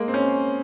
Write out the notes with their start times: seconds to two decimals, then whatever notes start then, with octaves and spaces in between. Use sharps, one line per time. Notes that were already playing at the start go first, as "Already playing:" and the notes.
Already playing: G#3 A#3
0.08 C4
0.14 C#4